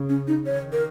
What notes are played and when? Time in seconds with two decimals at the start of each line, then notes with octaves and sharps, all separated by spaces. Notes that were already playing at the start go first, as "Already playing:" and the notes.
Already playing: C#3
0.09 C#4
0.27 D#4
0.46 D#3 C#5
0.72 A#4